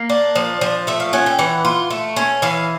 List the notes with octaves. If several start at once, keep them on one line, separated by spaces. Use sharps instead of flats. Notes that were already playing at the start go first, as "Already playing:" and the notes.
Already playing: A#3
D4
F3
F3
A3 E5
F5
C#4 F#5
G5
E3 F#5
F4
A3
C#4
E3 F5